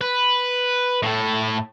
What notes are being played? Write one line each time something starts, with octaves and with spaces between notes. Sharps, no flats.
B4
A2 A4